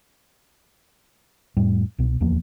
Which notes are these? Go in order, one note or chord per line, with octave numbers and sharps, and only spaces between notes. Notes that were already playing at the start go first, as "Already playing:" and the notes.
F2 A2 G3
C2 B2
D1 E2 F3 A#3